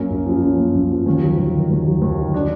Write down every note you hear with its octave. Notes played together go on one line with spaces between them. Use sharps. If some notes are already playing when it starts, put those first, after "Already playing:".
Already playing: F#2 A#3
F#2
F3
F#2
A#3
F#2
F3
D#2
F#3
D#2
D#3
D#2
F#3
D#2
D#3
D4